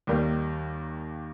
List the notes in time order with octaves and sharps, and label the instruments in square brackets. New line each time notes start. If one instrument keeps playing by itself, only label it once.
[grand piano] D#2 D#3 G3 A#3